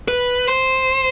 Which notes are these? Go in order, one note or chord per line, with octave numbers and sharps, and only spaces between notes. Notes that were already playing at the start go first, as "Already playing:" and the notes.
B4
C5